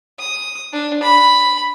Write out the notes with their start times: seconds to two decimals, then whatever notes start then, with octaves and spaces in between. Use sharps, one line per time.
0.19 D#6
0.73 D4
1.03 B5